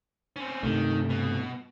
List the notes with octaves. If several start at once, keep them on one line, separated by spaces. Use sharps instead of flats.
C4 C#4
G2 C3 D#3 A3
B2